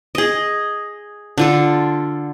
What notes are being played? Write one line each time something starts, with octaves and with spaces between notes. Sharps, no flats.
G#4 D#5
D3 F4 A4